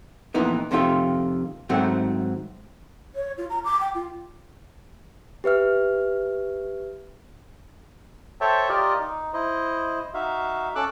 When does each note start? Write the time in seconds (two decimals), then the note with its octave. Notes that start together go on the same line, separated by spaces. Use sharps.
0.34 F2 A#2 E3 B3 D#4
0.71 F2 C3 D#3 A3 F4 G5
1.69 G#2 D#3 F#3 A3 C4
3.15 C#5
3.38 F4
3.50 A#5
3.65 D6
3.81 G5
3.95 F4
5.44 G4 B4 E5 F6
8.41 A4 C5 C#5 E5 G5 A5
8.69 F4 G4 A#4 D5 D#5
8.99 D#4
9.33 E4 C5 D#5
10.14 D#4 F#4 E5 F5
10.75 C#4 A4 D6 E6 F#6